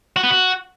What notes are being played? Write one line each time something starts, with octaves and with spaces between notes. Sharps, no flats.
F#4
B3
F#4